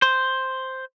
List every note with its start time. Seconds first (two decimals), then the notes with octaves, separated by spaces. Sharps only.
0.02 C5